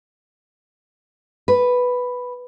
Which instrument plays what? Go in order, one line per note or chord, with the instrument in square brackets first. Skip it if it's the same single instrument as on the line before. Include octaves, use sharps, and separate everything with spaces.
[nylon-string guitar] B4